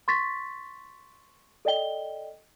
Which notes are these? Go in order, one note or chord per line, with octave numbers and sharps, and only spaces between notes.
C6 C#6 A6 B6
A4 D5 D#5 G5 G7